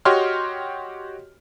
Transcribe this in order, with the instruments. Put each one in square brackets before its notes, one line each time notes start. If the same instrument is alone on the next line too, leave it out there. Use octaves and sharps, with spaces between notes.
[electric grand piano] F#4 G4 C#5 D#5 C6 F6